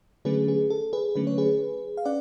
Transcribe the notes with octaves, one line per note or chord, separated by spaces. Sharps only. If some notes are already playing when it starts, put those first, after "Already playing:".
D3 F#3 A3 C#4 G#4 B4
G#4
A4
G#4 B4
D3 F#3 A3 C#4 B4
C#5
G#4 B4
F5
C#4 D5 F#5